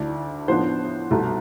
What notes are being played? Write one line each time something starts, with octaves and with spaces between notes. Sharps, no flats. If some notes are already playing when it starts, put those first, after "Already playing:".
Already playing: D2 D3 A3 E4 D5
A2 F3 B3 D4 C5
C2 B2 A3